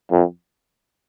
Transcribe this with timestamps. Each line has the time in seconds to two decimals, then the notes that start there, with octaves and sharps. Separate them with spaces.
0.12 F2